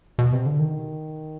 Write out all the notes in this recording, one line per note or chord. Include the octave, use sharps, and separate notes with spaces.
B2
C3
D3
D#3